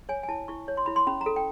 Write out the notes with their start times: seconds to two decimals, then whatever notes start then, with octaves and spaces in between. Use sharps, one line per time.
0.09 C#5 G#5
0.23 G#5
0.28 E4 A5
0.48 E4 C#6
0.68 C#5
0.77 C6
0.86 E4 B5
0.96 C6
1.07 C#4 B5
1.21 A#5
1.26 A4
1.36 G5